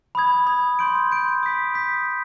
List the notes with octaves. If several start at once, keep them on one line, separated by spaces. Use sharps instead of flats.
B5 D#6 G#6
B5 D#6 G#6
C6 G6 D7
C6 G6 D7
D#6 G6 B6
D#6 G6 B6